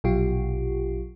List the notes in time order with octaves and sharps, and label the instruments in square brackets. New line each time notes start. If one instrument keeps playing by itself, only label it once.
[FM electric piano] A#1 B2 F#3 F4 G4